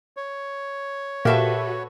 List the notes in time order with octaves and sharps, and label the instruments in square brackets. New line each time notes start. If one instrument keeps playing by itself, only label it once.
[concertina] C#5
[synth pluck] A#2 [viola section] F#4 A4 B4 [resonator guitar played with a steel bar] G4 E5 A5